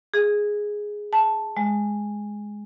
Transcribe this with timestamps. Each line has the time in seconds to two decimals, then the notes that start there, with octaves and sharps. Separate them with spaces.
0.14 G#4
1.13 A5
1.57 G#3